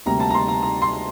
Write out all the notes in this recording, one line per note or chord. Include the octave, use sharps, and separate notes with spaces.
D2 C3 G3 A#3 A#5
A5
A#5
C6
A#5
A#5
C6